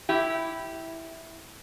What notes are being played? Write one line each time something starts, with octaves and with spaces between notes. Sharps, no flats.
E4 G4